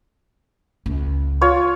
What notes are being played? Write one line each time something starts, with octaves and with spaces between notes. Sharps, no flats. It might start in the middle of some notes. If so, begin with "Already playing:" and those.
C#2
F4 C#5